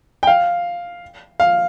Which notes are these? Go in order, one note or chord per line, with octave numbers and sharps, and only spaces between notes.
G5
F5
F5